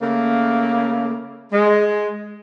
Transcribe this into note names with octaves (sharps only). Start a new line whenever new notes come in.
C#3 A3 A#3
G#3